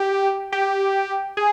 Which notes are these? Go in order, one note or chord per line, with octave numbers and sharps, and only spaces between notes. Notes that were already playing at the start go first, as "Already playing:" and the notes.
Already playing: G4
G4
G#4